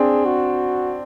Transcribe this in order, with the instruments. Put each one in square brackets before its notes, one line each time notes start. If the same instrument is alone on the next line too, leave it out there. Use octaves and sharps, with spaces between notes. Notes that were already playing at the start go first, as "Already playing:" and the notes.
Already playing: [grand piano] C4 D4 [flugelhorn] G#4
[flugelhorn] F#4